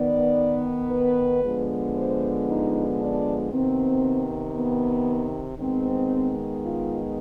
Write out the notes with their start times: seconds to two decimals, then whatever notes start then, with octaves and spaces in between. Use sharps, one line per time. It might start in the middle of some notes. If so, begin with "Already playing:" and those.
Already playing: D#3 B3 D5
0.90 B4
1.42 D3 F3 G#3 B3
1.95 C5
2.46 D#4
2.98 D4
3.51 C3 D#3 B3 C4
4.55 B3
5.58 D#3 G#3 B3 C4
6.62 F4